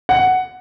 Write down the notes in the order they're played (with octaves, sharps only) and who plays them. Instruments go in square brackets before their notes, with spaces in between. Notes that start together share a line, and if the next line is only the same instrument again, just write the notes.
[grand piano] F#5